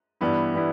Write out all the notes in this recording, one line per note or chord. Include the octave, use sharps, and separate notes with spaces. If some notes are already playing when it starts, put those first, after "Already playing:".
G2 E3 G3 B3 E4
E3 G3 B3 E4